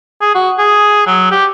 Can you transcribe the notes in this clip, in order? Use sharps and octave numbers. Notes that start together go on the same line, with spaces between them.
G#4
F#4
G#4
F#3
G4